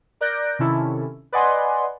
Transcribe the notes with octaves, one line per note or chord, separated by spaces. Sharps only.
A#4 D5 F#6 G6 A#6 D7
C3 D#3 C#4 E4 A4
B4 D5 D#5 F#5 G#5 C6